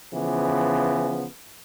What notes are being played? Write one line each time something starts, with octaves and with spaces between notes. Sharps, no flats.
C#3 E3 F3 B3